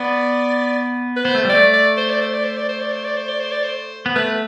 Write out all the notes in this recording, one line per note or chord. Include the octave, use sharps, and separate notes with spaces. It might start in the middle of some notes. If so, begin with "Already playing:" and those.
Already playing: B3 D5
B4
B3 C5
A3
G3
D5
A3
D5
C5
D5
C5
D5
C5
D5
C5
D5
C5
D5
C5
D5
C5
D5
C5
B3
A3 B4